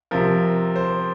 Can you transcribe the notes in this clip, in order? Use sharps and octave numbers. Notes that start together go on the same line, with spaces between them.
C3 F3 A#4
C5